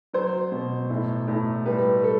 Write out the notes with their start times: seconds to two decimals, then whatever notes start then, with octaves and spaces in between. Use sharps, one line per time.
0.13 F#3 C5
0.52 B2
0.90 A2
1.28 A2
1.65 G3 B4
2.04 A4